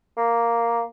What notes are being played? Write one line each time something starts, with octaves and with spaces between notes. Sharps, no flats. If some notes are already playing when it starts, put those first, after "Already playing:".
A#3